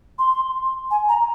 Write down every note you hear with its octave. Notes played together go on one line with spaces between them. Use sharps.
C6
G#5
A#5